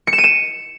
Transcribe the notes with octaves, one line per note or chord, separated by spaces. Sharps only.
C#7
E7
D#7
E7